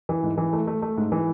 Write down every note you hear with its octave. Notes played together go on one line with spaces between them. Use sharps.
E3
G#2
E3
A3
A3
A3
G#2
E3